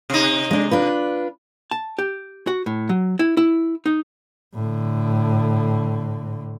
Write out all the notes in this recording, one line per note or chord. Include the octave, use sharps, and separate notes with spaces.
C3 D#4
G#3 D4
D4 F4 B4
A5
G4
F#4
A2
F#3
E4
E4
D#4
A2 D3